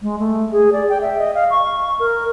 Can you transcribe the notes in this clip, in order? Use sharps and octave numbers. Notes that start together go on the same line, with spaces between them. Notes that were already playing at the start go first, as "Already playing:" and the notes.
G#3
A3
G#4
D5
G5
E5
D#5
F5
C#6
A#4